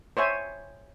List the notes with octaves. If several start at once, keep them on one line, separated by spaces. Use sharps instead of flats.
C5 C#5 E5 G#5